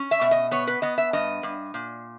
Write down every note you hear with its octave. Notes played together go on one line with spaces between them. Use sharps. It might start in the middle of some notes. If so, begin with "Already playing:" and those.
Already playing: C#4
E5
B2
D#5
B3 C#5
B4
B3 D#5
E5
G2 D#5
G2
A#2